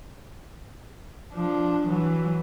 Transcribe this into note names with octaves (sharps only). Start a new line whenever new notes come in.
F3 D4
E3 F#3